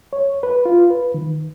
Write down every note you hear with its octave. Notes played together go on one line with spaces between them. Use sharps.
C#5
B4
F4
B4
D#3